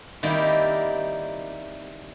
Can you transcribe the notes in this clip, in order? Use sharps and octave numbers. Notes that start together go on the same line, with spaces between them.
D#3 G3 A#3 C4 E4 G4